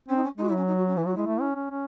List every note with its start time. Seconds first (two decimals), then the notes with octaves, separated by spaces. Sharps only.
0.08 C4 C#4
0.16 D#4
0.23 C#4
0.37 G#3 D#4
0.43 F#4
0.48 E4
0.52 F#3 C#4
0.67 D#4
0.77 F#4
0.87 C#4
0.96 E3 E4
1.06 F#3 F#4
1.15 G#3 E4
1.26 A3
1.41 C#4
1.55 C#4
1.71 C#4